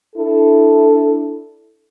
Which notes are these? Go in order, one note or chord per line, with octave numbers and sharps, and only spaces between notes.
D4 E4 A4